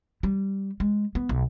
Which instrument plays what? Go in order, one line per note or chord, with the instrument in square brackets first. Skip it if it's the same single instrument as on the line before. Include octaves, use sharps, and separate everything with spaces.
[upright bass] G3
G#3
B3
B1